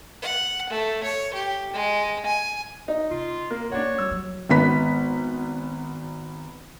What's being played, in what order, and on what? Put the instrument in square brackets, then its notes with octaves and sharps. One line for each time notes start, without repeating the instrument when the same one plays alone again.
[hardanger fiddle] F#5
A3
C#5
G4
G#3
G#5
[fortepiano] D#4
[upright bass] C3 [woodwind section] F4
[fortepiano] A#3
[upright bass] A#3 C#4 [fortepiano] D4 F#4 [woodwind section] C#5
[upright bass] G3 [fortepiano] E6
[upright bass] F#3 G3
[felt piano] G#1 B3 B6